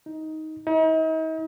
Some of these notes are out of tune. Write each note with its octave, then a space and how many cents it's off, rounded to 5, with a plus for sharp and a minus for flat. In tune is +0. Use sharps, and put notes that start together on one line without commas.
D#4 +10
D#4 +40